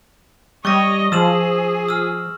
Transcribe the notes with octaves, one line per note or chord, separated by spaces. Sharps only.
G3 C#5 D#5 C#6 D6 A#6
F3 G#4 E6 E7 F#7
E6 F6